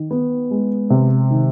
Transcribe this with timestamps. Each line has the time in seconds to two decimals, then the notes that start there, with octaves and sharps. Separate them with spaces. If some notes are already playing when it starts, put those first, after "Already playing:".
Already playing: D#3
0.11 B3
0.51 G#3
0.90 C3
1.30 D#3